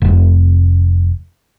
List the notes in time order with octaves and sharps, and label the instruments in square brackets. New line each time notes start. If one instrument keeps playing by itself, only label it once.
[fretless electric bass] F1